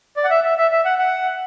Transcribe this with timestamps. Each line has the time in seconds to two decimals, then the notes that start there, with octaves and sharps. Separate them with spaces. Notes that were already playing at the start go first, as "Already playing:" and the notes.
0.17 D5
0.24 F#5
0.30 E5
0.44 E5
0.58 E5
0.72 E5
0.85 F#5
0.98 F#5